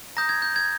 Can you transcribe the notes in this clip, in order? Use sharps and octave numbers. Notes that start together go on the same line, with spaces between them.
A#5 D#6 G6 A#6
G#6
G6
G#6